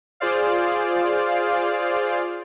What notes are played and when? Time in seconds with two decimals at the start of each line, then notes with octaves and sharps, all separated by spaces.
0.20 F4 G#4 C5 D5 F5